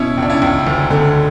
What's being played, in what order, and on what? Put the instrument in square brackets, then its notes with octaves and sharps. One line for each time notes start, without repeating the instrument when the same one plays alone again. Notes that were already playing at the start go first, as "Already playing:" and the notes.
Already playing: [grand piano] B2 C#4 E4
C#2 D4
C#4 E4
C#2
D2
D3